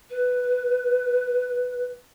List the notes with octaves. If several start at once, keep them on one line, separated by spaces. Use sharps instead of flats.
B4